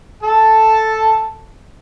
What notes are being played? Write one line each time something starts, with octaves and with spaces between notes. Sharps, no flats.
A4 A5